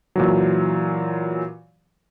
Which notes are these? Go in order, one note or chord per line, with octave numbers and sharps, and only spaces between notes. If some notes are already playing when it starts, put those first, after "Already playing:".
A#2 E3 F#3